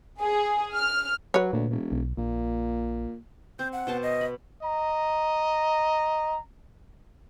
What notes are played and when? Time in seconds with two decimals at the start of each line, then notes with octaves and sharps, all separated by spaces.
0.21 G#4
0.75 F6
1.34 F#3 B4 C#5
1.53 D2 A#2
1.70 E1
1.92 B1
2.17 A#1 A#2
3.59 C4 G6
3.72 F#5
3.87 B2 C5 A5
4.02 D#5
4.21 B5
4.63 D#5 A#5